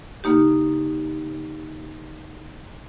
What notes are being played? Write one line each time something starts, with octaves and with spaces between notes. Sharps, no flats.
C#3 A#3 D#4 G4